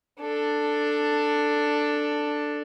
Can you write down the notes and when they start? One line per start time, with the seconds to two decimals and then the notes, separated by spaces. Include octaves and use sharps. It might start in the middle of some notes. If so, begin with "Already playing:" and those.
0.21 D4 A4